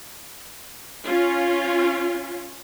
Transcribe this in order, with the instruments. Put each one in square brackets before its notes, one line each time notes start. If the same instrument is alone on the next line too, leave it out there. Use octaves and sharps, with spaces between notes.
[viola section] C#4 F4